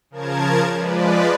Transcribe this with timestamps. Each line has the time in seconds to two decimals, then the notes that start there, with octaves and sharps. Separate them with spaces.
0.10 C#3 F3 A#4 A5 G#6
0.75 F3 G#3 B4 D5